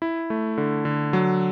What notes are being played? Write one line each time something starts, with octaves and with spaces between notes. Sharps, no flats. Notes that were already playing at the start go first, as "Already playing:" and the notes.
E4
A3
D3
D3
F#3